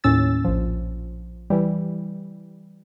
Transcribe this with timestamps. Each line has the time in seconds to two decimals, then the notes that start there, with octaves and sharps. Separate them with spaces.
0.04 D#2 A2 C#4 E6 A6
0.45 A#1 F3
1.50 E3 G3